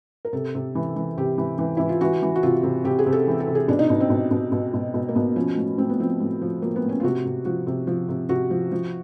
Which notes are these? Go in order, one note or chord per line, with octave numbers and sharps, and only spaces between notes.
A#4
C3 A4
C3
E3
E3
C3 G4
E3
E3
E3 E4
F4
E3 F#4
E3
F#4
C3 F4
C3
C3 G4
G#4
C3
A4
E3
A4
C3
G#4
B2 D4
D#4
B2
C4
B2
B2
B2
B2
B2
A#3
B2 B3
F3 C#4
A2 C#4
A2 C4
B3
F3 C4
A2
F3
F3 A#3
B3
A2
C#4
F4
C3 F#4
C3
F3 F#4
C3
F3
C3
C3 F#4
F3
F3